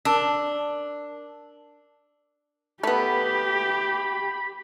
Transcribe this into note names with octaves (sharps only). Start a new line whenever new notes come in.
D4 A#4 A5 E6
A3 B3 G4 B5